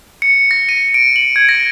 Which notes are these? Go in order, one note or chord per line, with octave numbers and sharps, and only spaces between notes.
C#7
A#6
D#7
D7
F#7
G#6
A#6